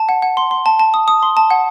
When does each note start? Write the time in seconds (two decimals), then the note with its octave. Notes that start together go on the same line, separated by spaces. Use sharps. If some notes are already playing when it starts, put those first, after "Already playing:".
Already playing: A5
0.09 F#5
0.22 F#5
0.37 C6
0.51 C6
0.66 A5
0.79 A5
0.94 D#6
1.08 D#6
1.23 C6
1.37 A5
1.51 F#5